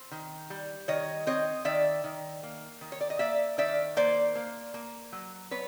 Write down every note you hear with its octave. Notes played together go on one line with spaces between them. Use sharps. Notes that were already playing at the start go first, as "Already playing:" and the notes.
Already playing: C4
D#3
G3
D#3 C#5 D#5
C4 C#5 D#5
D#3 D5 E5
D#3
A#3
D#3
C#5
D5
D#5
A#3 D5 E5
D#3 D5 E5
A#3 C5 D5
A#3
A#3
F#3
B3 B4 C#5